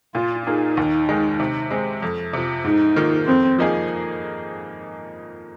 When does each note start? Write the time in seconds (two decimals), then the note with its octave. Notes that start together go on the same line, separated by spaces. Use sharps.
0.14 A#2 F4
0.46 A#3 D#4 F4 G#4
0.77 D#2
1.09 D#3 G#3
1.40 C3
1.70 G#3 C4
2.02 F2
2.33 C3 F3
2.64 G#2 D#4
2.96 D#3 A#3 F4
3.27 F2 C4
3.58 F3 A#3 D#4 G#4